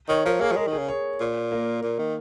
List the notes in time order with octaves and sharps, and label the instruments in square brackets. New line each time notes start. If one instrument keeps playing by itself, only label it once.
[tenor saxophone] D#3 [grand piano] C#5
[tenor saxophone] F3 [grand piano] A#4
[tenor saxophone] A#3 [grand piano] G#4
[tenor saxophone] F3
[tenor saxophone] G#3 [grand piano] A#4
[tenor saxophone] D#3
[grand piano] G#4
[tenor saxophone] C#3
[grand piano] C#5
[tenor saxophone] A#2
[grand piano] A#3
[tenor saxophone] A#2
D#3